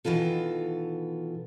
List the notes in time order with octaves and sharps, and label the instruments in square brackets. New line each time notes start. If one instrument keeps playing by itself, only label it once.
[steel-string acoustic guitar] B2 D#3 E3 F4 A4